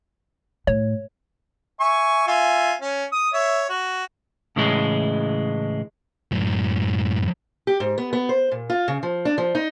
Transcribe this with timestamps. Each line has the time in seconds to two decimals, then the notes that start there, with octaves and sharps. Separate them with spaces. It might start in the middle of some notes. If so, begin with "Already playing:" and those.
0.67 A2 C#5
1.80 E5 G#5 C#6
2.27 F4 E5 G#5
2.81 C#4
3.12 D#6
3.33 C#5 E5
3.69 F#4
4.56 A2 C#3 E3 G#3
6.32 F#2 A2
7.67 G4
7.80 G#2
7.98 B3
8.13 B3
8.29 C5
8.52 A#2
8.70 F4
8.88 C#3
9.03 F3
9.25 D4
9.38 F3
9.55 D#4